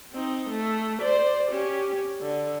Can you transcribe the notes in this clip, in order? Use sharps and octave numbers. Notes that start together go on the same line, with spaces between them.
C4 D#4
A3
C5 D5
C#4 G4
D3